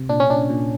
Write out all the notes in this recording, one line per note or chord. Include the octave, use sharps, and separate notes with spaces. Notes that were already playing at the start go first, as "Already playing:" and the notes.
Already playing: C3
A#2 D4
C#4
A#2 D4
A#2